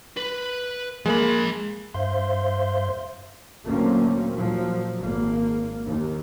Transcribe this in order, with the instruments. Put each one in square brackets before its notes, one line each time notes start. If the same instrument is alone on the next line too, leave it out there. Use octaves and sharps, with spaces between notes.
[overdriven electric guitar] B4
[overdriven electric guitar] F3 B5 [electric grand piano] G#3 A#3
[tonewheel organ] G2 C5 E5 F5 C6 G6
[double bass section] D2 A#2 F#3 A#3 C4 C#4
A#2 F3 F#3
G#1 A#3
D#2